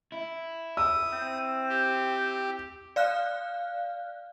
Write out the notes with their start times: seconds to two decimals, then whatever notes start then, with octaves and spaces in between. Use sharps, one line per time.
0.12 E4
0.77 D#6 E6
1.13 C4
1.69 G4
2.96 D5 F5 F6 F#6